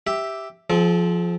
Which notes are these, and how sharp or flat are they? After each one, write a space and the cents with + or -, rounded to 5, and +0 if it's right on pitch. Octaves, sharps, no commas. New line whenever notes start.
G4 +0 E5 +0
F3 +0 C4 +0 G#4 +40